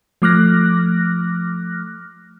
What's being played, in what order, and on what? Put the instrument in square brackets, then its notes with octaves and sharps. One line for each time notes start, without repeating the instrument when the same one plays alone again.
[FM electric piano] F3 A3 D6 F6 F#6 A#6